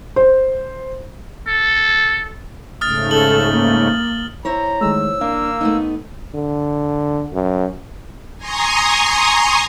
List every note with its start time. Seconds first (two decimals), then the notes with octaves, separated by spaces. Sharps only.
0.16 C5
1.47 A4
2.81 G#2 C#3 A3 D#6 F6 A6
3.11 A4 F#7 G7
3.50 A#3
4.45 E4 C5 C#5 A#5
4.81 D#3 G#3 A3 E6
5.21 A#3 D4 F5
5.61 A3 B3 D#4
6.35 D3
7.33 F#2
8.37 G#5 A#5 C6 C#6 D#6